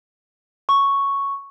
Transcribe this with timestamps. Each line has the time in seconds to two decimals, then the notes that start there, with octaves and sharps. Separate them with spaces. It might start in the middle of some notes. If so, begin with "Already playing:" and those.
0.69 C#6